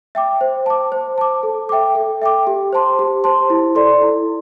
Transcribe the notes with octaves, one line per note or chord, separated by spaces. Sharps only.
E5 G5 D6
C5
A5 D6
C5
A5 D6
A4
E5 G5 D6
A4
E5 G5 D6
G4
C5 A5 C6
G4
C5 A5 C6
E4
A4 D5 C6
E4